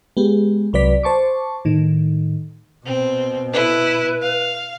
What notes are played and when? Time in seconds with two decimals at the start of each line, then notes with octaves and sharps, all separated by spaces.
0.17 G#3 B3 G4
0.73 C2 F#3 B4 D5 B6
1.03 C5 A5 C#6 D6
1.65 A2 D#3
2.86 B2 C4
3.53 E4 B4
4.22 F5